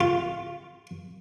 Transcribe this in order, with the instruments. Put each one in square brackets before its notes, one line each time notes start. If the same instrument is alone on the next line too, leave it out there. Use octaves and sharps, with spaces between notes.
[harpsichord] F4